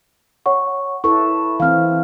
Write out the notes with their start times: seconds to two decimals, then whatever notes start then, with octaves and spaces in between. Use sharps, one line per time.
0.46 C#5 F#5 C#6
1.04 E4 A4 B4 C#6
1.60 E3 C4 F5 F6